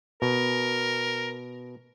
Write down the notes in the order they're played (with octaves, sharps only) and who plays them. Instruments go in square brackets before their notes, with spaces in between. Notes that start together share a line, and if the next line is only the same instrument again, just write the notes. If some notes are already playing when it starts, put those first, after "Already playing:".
[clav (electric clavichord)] B2 [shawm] A#4